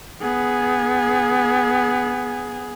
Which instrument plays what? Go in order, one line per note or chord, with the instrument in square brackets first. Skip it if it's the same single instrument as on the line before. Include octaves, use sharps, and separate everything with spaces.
[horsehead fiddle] B3 G#4